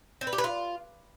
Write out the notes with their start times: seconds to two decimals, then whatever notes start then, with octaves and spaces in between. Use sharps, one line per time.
0.21 C4
0.27 B4
0.33 G4
0.38 B4
0.44 F4